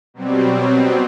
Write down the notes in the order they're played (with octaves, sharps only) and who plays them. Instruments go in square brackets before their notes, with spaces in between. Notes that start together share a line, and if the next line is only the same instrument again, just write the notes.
[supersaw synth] B2 F#3 G3 C4